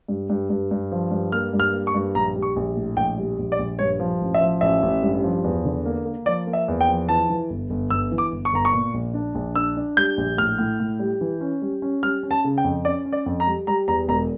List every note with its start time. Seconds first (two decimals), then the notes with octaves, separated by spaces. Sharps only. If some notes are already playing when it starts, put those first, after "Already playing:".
0.08 G2
0.30 G2
0.50 G2
0.71 G2
0.92 F3
1.11 G2
1.32 A#3 F6
1.53 G2
1.60 F6
1.73 A#3
1.87 C#6
1.94 G2
2.15 A#1 A#5
2.36 G3
2.42 C#6
2.56 A#1
2.76 A2
2.97 A#1 G5
3.17 G3
3.39 A#1
3.52 D5
3.59 A#1
3.79 G2 C#5
4.00 F3
4.21 A1
4.34 E5
4.41 F3
4.61 A1 E5
4.82 A1
5.03 G2
5.24 F3
5.44 E2
5.65 D3
5.85 A#3
6.06 A#3
6.26 F3 D5
6.47 A#3
6.53 E5
6.68 E2
6.81 G5
6.88 F3
7.09 E3 A5
7.30 E3
7.50 G1
7.70 G1
7.90 G1 E6
8.11 E3
8.18 D6
8.32 G1
8.45 C#6
8.53 G1 A#5
8.65 C#6
8.73 A#2
8.94 A#1
9.14 D4
9.35 A#1
9.55 D4 E6
9.77 D4
9.97 G3 G6
10.17 A#1
10.38 A2 F6
10.58 A2
10.80 A2
10.99 G3
11.21 E3
11.41 C#4
11.62 G3
11.82 C#4
12.03 G3 F6
12.23 C#4
12.31 A5
12.44 C#3
12.58 G5
12.64 F2
12.84 C#4 D5
13.05 C#4
13.13 D5
13.26 F2
13.40 A#5
13.47 G3
13.67 G3 A#5
13.88 E2 A#5
14.08 E1 A#5